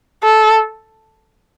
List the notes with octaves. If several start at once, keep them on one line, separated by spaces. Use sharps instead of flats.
A4